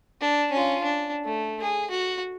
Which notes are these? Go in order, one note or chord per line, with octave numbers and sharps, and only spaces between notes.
D4
C#4 F4
D4
A3
G#4
F#4